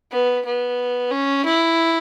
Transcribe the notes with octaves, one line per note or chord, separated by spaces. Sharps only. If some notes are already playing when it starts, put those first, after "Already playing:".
B3
B3
C#4
E4